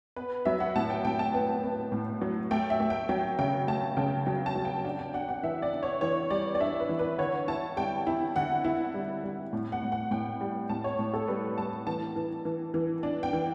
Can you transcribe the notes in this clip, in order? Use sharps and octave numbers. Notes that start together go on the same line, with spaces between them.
B3 B4
F#3 E5
F#5
A2 A5
G5
A2 G5
A5
B3
B3
A2
F#3
A3 G5
E5
A3
G5
F#3 G5
C#3 G5
A3 A5
C#3 G5
F#3 G5
A5
F#3
G5
D4 G5
G5
D4 F#5
F#5
E3 E5
D5
D4
C#5
E3 C#5
G3 D5
D5
D4 E5
B4
E3
B4
D3 C#5
E4 A5
G3 G5
E4
D3 F#5
E4
G3
G3
A2
F#5
A2
F#5
A2 G5
G3
A2 A5
C#5
A2
A4
G3 B4
G3 A5
E3 A5
E3
E3
E3
D4
G5
E3